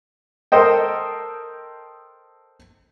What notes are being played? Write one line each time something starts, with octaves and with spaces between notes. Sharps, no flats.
A4 A#4 C5 D#5 G5